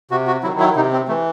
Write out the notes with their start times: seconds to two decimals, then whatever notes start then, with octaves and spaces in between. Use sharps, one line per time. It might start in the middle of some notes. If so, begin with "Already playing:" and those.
0.11 C3 F#4
0.27 F#4
0.43 D#3 F#3 E4
0.60 E4
0.76 C3 D#4
0.92 C4
1.08 E3 A3